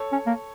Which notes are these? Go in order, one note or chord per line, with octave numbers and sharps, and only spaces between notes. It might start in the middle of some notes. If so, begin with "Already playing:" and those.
Already playing: A4 C#5
C#4
A#3